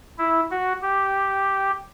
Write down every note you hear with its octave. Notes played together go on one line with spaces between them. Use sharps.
E4
F#4
G4